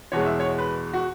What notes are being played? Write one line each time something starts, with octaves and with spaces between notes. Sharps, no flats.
E2 B2 G#3 C#5
E5
C#5
B4
F#4